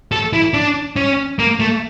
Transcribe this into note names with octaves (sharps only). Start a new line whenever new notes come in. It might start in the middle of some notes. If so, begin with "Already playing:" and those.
A4
E4
D4
C#4
A#3
A3